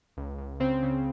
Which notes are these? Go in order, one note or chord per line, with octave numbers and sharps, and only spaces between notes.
C#2
C#2
C#3 C4
C#3